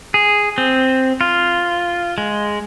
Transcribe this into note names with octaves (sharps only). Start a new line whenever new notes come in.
G#4
C4
F4
G#3